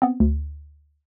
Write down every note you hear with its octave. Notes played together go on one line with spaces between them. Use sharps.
B3 C4
D2